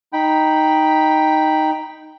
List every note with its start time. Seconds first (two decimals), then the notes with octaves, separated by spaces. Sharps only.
0.13 D#4 G5 B5